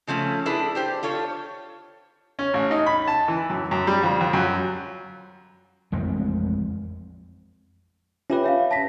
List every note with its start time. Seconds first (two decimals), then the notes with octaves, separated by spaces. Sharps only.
0.07 C#3 F3 A3 C#4
0.46 D4 E4 G#4 A4 B4
0.75 D4 G4 C5
1.03 F4 A4 C#5
2.39 C#4
2.54 A1
2.71 D#4
2.86 B5
3.07 A5
3.28 E3
3.50 F#2
3.71 F#2
3.87 G3
4.04 F2
4.21 F2
4.33 F#2
5.92 A1 F2 G#3 C4
8.30 C#4 F4 G4 B4 E5
8.44 C#5 E5 F5
8.71 A5 A#6 B6